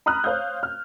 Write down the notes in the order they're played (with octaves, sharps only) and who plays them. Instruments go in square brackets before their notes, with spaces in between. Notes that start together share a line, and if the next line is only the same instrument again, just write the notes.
[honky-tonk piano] A#5 B5 D#6 F6 F#6
C5 C#5 F5 D#6 G6
F6